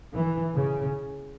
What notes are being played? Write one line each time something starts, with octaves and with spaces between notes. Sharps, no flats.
E3
C#3